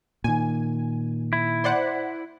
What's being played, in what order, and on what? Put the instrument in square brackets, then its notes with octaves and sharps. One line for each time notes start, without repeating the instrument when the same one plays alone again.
[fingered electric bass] A#2 D#3 [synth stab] G#5
[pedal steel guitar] E4
[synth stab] C5 D5 F#5